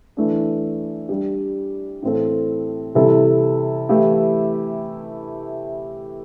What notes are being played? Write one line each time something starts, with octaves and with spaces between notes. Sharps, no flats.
E3 A3 D4
G3 D4 G4
A2 E3 C4 A4
C3 E3 G3 E4 A4
E3 A3 E4 G4